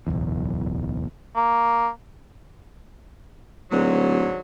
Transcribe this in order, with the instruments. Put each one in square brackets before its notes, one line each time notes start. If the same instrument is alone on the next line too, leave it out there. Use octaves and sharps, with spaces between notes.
[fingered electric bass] D1 B1 E2
[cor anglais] A#3
[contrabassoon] D1 [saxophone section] G#2 D3 F#3